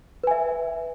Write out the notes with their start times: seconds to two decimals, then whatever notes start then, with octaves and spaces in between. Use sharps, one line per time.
0.24 B4
0.27 G#5
0.31 E5